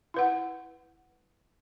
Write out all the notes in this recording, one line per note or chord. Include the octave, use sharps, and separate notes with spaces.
E4 B4 F#5